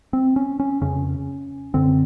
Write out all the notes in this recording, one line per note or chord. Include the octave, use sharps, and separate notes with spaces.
C4
C#4
C#4
F2 C#3 C#4
F#2 D3 C4